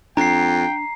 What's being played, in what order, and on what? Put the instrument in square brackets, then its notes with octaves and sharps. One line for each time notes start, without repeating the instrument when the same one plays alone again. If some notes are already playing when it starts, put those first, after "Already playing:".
[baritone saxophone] F2 [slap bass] D4 [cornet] G5 [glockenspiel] A#5 C7